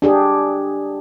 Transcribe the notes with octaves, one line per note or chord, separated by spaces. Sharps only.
D4 G4 G#4